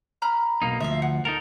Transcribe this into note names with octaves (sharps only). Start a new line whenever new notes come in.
A#5 B5 F6
B1 A#3 D#4
D2 F3 E5 F5
F#5
D#4 A4 A#4 A5